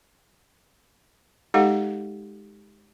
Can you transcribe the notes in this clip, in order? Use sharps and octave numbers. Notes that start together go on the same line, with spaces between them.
G#3 D#4 G4 A4 F5 F#5